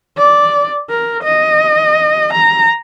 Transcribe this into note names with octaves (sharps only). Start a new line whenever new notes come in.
D5
A#4
D#5
A#5